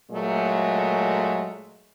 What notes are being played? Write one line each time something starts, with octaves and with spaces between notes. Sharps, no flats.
A#2 F#3 G#3 A3